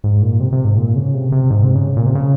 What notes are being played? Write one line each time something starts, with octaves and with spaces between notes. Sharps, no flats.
G#2
A#2
C3
C3
G#2
A#2
C#3
C3
C3
G#2
C3
C#3
A#2
C3
C#3